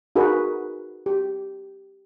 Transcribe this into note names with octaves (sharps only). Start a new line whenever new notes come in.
D#4 F#4 G#4 A#4 B4
G4